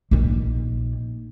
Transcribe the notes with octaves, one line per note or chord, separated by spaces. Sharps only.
A#1 D#4